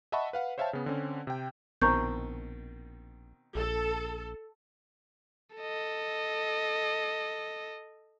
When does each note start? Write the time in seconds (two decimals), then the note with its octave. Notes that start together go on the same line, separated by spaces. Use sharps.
0.12 D#5 E5 F#5 A5 B5 C#6
0.33 B4 F5 F#5
0.58 C5 C#5 E5 F5 G5 A5
0.73 C#3 B3
0.86 D3 C4 C#4
1.27 C3 G5
1.82 A#1 B2 D#3 C4 A#5 C#6 G6
3.55 A#1 A4
5.56 A4 D#5